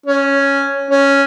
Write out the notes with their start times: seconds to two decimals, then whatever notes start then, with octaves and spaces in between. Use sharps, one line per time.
0.06 C#4
0.91 C#4